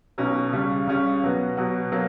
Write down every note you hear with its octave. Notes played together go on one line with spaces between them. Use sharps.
B1 B2 F#3 C#4
C#2 C#3 G3 C#4
C#2 C#3 G3 C#4
B2 F#3 B3 F#4
B2 F#3 B3 F#4
B2 F#3 A#3